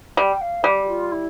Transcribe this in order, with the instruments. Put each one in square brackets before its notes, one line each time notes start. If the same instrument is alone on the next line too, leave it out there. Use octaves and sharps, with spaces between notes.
[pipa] G3 [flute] G5
[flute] F5
[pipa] G3 [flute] G4
[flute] F4
E4